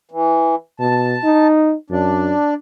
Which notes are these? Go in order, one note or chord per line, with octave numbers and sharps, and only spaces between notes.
E3
B2 A5
D#4
F#2 D4